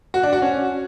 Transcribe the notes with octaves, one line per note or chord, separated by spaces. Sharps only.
F#4
D4
F#4
C#4